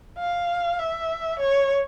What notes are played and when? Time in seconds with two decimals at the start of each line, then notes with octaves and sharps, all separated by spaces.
0.19 F5
0.79 E5
1.40 C#5